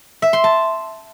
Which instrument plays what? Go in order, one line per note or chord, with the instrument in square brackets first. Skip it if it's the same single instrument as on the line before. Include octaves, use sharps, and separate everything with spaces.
[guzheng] E5
C6
A5